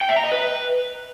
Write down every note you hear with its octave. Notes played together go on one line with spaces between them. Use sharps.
G5
E5
A#5
D#5
B4